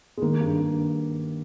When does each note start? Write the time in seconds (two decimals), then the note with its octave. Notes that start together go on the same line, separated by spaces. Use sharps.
0.17 G#3
0.22 D#3 A#3
0.40 G2
0.59 G2